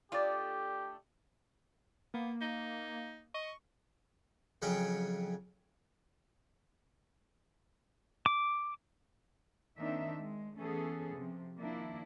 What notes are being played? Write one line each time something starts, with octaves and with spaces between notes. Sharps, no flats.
A3 D4 F4 G4 D5 D#5
A#3 B3
D#4
D#5 C#6
F2 C#3 F#3 C#4 G5 G#5
D6
D#3 A#3 C4 D4 D#4 E5
G#3
E3 A3 B3 C#4 G#4 A4
C3 F3
D#3 F3 A#3 D4 E4